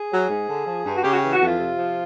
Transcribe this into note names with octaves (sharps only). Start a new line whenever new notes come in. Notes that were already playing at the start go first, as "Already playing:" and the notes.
Already playing: G#4
F#3
G#2
D3
F3
G2
F#4
C#3 G4
F#4
E3 G4
F#4
F2 F4
C3
F3